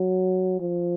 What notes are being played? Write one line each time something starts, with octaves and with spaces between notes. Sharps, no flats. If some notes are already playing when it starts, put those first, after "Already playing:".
Already playing: F#3
F3